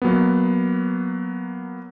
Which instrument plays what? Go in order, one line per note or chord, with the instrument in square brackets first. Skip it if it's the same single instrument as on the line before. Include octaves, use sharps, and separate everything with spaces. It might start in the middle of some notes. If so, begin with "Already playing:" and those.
[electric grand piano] F#3 A#3 B3